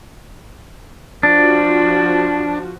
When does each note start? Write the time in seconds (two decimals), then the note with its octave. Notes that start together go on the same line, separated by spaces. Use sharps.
1.23 F3 D4 F#4